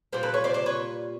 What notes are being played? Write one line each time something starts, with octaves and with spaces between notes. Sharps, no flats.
A#2 G3 A#3 A#4 C5
A4 B4
B4 C#5
C5 D5
C5 D5
B4 C#5